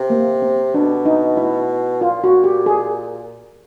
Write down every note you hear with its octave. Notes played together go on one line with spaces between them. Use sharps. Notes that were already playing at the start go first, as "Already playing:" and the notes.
Already playing: C3
A#3
C4
B2 D4
D#4
E4
A#2 F4
F#4
G4
G#4